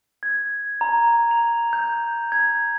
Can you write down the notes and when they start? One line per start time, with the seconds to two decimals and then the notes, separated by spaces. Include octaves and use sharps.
0.23 G#6
0.81 A#5
1.31 F7
1.73 G6
2.32 G#6